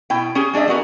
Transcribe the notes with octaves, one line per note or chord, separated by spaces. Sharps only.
B2 E4 G5
C#4 G4 G#4
G#3 D4 G#4 D#5 E5
G3 B3 F#4 A#4